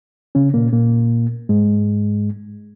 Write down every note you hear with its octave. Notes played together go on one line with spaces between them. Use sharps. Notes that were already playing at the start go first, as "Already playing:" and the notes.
C#3 C#4
A#2 A#3
A#2 A#3
G#2 G#3